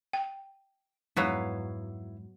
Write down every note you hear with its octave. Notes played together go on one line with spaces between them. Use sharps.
G5
F2 G#2 F#3 B3 E4 B4 F5